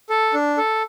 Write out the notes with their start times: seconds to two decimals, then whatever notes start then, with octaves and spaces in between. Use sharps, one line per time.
0.10 A4
0.34 D4
0.58 A4